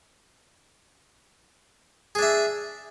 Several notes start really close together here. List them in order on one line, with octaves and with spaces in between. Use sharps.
G#4 D4 E5